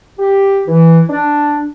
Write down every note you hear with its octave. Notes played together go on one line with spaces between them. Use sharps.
G4
E3
D4